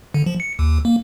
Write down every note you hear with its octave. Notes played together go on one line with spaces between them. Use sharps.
D3
F3
C#7
D#2
A#3